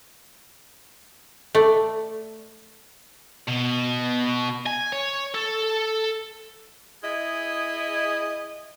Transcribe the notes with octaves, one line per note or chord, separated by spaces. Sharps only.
A3 D5
B2
G#5
C#5
A4
E4 G#4 D#5